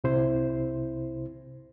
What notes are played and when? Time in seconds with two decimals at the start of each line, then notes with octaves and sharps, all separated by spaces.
0.04 C2 C3 E4 C5